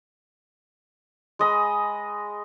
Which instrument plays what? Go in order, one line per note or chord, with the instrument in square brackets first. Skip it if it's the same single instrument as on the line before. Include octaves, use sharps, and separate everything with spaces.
[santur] G#3 D#5 B5